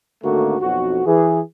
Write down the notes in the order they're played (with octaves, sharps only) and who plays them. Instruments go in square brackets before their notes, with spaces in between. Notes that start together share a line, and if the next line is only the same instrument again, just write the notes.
[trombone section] G#1 D2 D3 A3 A#3 F#4
B1 F2 F#4
E3 G#4